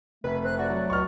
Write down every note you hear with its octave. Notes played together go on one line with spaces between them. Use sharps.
F1 A3 B4
C4 F#6
F#4 D5
F#3
C#2 C#6 F6